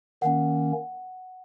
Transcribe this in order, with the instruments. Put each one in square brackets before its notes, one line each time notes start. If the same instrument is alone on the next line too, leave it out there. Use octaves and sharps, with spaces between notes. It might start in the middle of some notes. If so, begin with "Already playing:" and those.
[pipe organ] D#3 A#3 C#4 [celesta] F#5